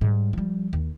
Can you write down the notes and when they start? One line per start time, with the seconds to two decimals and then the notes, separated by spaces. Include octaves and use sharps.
0.01 G#2 G3
0.33 F3 G3
0.73 D#2